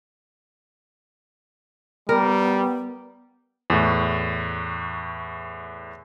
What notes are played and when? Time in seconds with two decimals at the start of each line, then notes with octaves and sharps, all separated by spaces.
2.09 G3 B3 A#4
3.70 E2 A2